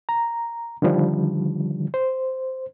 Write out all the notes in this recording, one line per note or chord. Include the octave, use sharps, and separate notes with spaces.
A#5
D3 D#3 F3 G3
C5